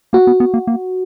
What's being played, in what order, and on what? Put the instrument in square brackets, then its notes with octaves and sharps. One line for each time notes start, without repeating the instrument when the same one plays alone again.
[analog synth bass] A#3 [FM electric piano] F#4
[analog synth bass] B3
B3
A#3
A#3